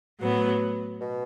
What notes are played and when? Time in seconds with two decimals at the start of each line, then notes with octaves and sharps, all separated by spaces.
0.20 A2 F#3 B3
1.01 B2